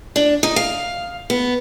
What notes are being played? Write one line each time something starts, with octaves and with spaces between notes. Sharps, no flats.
D4
D#4
F5
B3